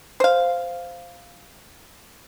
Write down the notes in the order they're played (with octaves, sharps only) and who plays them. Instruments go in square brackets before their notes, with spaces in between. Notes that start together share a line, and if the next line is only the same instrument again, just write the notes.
[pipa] C5 F5